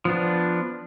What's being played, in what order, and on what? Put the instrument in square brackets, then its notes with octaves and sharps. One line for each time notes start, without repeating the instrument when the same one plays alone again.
[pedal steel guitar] F3 B3 D4